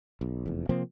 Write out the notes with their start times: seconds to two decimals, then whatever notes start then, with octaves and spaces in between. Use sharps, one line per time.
0.21 B1
0.46 F1 E2
0.69 C3 F3 A#3 C4